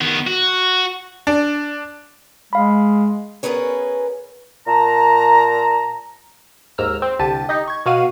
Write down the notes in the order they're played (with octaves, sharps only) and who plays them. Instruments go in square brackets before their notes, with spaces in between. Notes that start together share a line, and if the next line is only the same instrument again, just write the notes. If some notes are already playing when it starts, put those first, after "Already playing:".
[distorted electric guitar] D#3 B3
F#4
[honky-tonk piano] D4
[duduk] G#3 [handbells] F5 B5
[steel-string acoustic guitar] B3 C#4 G#4 A#4 B4 C#5
[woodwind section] A#2 A5 A#5
[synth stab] D#2 G#2 A#5 E6 F6
C4
C2 D3 G4 A5 D#7 E7
D#4 G4 D#5
C#6 G#6
B2 F#4 F5 D#7